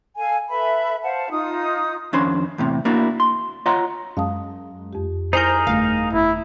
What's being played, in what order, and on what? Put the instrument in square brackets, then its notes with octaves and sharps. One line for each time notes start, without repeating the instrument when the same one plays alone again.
[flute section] A4 F5 G#5
A4 B4 E5 B5
C5 F5 F#5 A5
D#4 F4 D#6
[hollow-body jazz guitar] F2 D#3 C#4 D4 C5 B5
E2 A2 C3
A#3 D4 E4 F#4
C6
F4 C#5 D#5 F#5 A#5 C6
[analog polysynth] F#2 G#3 [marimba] F5 A5 D#6
[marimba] F2 G4
[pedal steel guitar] D#4 G#4 A#4 [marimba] E4 [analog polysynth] C5 G6
[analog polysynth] G1 F5 [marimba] A3
[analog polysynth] G1 [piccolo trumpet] E4